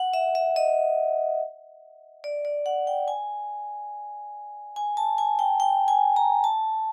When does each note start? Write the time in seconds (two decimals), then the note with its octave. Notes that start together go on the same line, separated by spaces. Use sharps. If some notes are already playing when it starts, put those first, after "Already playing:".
Already playing: F#5
0.14 E5
0.35 E5
0.56 D#5
2.24 D5
2.45 D5
2.66 F#5
2.87 G5
3.08 G#5
4.76 G#5
4.97 A5
5.18 G#5
5.39 G5
5.60 G5
5.88 G#5
6.16 A#5
6.44 A5